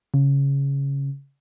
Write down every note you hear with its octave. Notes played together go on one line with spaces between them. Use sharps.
C#3